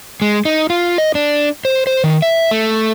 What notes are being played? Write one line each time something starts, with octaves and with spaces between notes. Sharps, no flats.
G#3
D#4
F4
D#5
D4
C5
C5
D#3
E5
A3